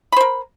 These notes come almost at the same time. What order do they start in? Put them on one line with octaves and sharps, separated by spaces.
B5 C5 A#4